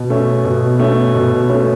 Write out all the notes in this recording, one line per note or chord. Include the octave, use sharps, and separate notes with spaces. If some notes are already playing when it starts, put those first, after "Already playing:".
Already playing: B2
A3 C#4
B2
A3 C#4
B2
A3 C#4